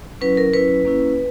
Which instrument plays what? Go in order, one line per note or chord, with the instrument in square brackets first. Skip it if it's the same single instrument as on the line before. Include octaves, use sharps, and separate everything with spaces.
[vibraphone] F#3 C#4 E4 B4
A#4
F#3 C#4 E4 B4
A#3 C#4 E4